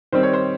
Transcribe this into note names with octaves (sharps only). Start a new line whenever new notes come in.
D#3 G3 C4 C5
C#5
C5